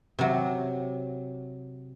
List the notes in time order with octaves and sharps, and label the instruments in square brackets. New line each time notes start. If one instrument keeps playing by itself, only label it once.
[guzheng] C3 F#3